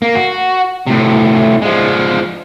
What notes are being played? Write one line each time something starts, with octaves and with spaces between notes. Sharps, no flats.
A#3
F#4
A2 C3
F3 G#3